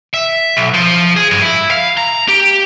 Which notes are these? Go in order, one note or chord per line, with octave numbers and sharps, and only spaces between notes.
E5
B1
F3
G#4
G2
E4
F5
A#5
G4